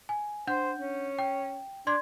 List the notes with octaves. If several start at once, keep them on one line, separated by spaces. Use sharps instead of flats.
G#5
D4 C5 F#5 G6
C#4
G5
D4 D5 C6 G#6